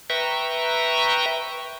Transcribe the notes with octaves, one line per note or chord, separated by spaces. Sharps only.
B4 E5 G5 A#5 C#6